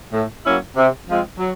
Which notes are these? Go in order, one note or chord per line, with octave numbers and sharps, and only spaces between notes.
A2
F#3 A#3 C#4 E4
C3
F3 G#3 C4 F4
F#3